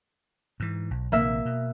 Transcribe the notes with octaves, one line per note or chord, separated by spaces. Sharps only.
G#2 E3
B1
A#1 C3 D#3 A#3 E5
B2